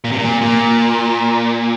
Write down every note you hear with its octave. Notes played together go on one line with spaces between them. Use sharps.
A#2
C3
A#2
A#2